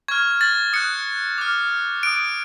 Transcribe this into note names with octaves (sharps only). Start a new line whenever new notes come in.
C#6 F6 G#6
A6
D#6 F#6 C#7
D6 F6
D#6 F#6 D7